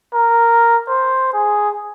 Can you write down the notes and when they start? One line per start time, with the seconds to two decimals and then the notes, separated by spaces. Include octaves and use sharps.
0.13 A#4
0.88 C5
1.34 G#4